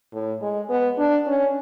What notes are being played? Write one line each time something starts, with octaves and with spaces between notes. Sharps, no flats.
A2
G#3
B3
D4
C#4